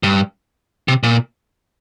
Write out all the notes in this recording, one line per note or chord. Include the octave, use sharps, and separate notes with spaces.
G2
C3
A#2